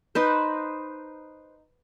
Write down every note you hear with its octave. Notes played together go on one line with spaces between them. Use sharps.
D#4 B4 C5